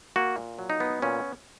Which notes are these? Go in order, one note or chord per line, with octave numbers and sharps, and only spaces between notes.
A#3 F#4
A#2
F#3
D#4
B3
A#2 C#4